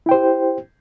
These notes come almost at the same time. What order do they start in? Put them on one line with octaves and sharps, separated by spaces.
E4 G5 C5 G4